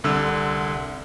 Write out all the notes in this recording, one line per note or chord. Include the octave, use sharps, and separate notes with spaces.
C2 D3 E6